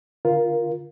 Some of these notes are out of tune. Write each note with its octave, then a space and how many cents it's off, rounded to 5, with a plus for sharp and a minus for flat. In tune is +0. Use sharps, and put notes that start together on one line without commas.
D3 +0 F4 +0 A#4 +10